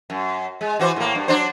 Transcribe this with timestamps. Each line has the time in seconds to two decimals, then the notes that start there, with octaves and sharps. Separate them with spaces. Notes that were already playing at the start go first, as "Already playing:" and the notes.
0.10 F#2
0.61 G#3
0.79 E3 F#4 C5
0.96 A2 A#3
1.15 G2
1.28 F#3 D4 C5